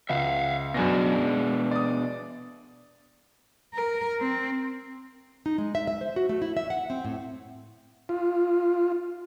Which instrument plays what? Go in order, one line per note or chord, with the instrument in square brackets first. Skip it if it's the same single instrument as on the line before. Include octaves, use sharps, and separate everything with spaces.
[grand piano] C#2 [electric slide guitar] E5 F5
[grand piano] F#2 G#5 A#6 [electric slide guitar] B2 D4
[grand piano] G#3
D5 D#6
[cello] A#4
C4
[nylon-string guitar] D#4
G#3
E5
E5
C5
F#4
A3
E4
E5
F#5
C4
A2
[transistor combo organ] F4